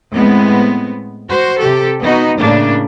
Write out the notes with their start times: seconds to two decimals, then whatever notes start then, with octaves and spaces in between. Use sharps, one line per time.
0.14 A2 G#3 B3 C4
1.29 F#4 C5
1.59 C3 G4 A4
2.01 B3 D#4 F#4
2.38 A2 C#3 A3 A#3 D4